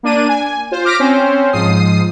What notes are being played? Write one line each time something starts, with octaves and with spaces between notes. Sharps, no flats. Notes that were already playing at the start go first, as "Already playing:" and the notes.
A#3 D4 D#7
G#5
F4 C5
D6 F6 A#6 B6 D7
C4 C#4 C5
G#2 F3 D#6 C7